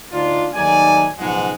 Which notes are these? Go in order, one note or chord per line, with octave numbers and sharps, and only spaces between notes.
D2 D4 D#4 F4
D#2 F#3 A3 D#4 D5 G#5
B1 G#2 C#3 F3 G#3 F#5